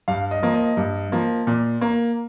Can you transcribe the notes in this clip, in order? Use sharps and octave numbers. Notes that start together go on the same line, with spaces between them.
G2 F5
D#5
F3 A#3
D#5
G2
F3 A#3
A#2
A#3